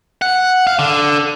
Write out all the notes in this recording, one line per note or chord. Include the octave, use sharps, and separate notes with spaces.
F#5
F5
D3